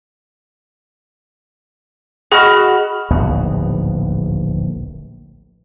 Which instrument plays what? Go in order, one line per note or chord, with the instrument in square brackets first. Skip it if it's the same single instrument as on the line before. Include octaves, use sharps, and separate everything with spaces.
[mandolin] F#4 B5 F6 [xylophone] G#4 D#5
[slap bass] D1 A#1 D#2 B3